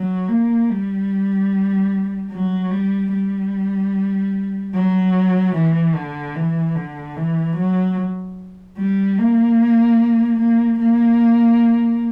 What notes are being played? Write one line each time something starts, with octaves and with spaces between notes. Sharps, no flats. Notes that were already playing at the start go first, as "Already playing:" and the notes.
Already playing: F#3
A#3
G3
F#3
G3
G3
F#3
E3
D3
E3
D3
E3
F#3
G3
A#3
A#3
A#3